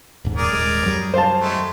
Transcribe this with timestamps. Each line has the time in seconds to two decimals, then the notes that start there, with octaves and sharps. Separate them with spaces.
0.25 D#1 G#2
0.36 G#4 A#4 D5
0.49 D#1 G#3
0.85 F#2 F#3 G3
1.14 C5 F5 A5
1.41 D#3 G#3 A3